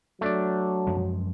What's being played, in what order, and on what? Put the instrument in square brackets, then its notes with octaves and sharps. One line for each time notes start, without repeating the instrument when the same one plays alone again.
[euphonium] F#3 [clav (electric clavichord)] A3 D4 D5
[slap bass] F#2 F3 G#3